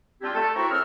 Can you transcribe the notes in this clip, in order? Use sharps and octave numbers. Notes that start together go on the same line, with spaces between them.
G3 C4 D4 E4 F4 G4
A3 A4
C4 E4 F#4 A#4 A#5 C#6
F#2 C4 G#4 E6 F6